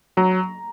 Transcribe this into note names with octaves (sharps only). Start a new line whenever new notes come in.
F#3 A#5